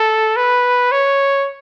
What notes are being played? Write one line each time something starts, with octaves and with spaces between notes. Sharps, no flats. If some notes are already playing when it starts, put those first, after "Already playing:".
Already playing: A4
B4
C#5